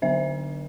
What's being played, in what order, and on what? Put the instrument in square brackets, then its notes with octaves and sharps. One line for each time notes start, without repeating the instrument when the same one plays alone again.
[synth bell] D3 F#3 B3 D4 C5 E5